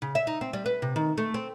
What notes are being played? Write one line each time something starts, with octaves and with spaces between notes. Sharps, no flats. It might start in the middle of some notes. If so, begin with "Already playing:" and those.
C#3
E5
D#4
C4
G3
B4
C3
D#3
A3
C4